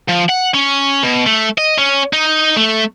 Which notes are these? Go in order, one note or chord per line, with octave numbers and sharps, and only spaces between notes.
F3
F#5
C#4
B2
A3
D#5
C#4
D#4
A3